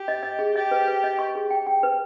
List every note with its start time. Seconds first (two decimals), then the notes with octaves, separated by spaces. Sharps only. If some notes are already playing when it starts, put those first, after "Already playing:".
Already playing: G4
0.08 D#5
0.23 D#5
0.39 G#4
0.55 G4 D#5
0.71 B4
0.88 B4
1.04 D#5
1.19 C#6
1.35 G#4
1.50 G5
1.67 G5
1.83 B4